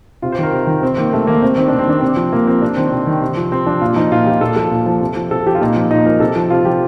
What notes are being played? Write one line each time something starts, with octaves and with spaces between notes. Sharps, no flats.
C3 F4
C5
D#3 A#4
C3
D#3
C3 C4
D#3 A#3
C3 A3
D#3 A#3
C3 C4
D#3 C4
C3 D4
C4
D#3 D4
C3 C4
F3
C3 A#3
F3 C4
C3 D4
D#3 C4
C3
D#3
C3
F3
C3 C4
F3 D4
A#2 F4
F3 D#4
A#2 F4
F3 G4
A#2 A4
F3 A4
A#2
F3
C3
F3
C3 A4
F3 G4
F4
A#2 D#4
F3
A#2 D#4
F3 A#4
C3 A4
F3
C3 F4
F3 G4